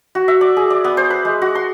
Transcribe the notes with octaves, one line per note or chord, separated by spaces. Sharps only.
F#4
E5
D5
G#4
D5
B3
C5
B4
G#3
F#4
C6